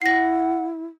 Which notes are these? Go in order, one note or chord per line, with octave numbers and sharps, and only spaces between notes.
E4 F#5 A#6 C7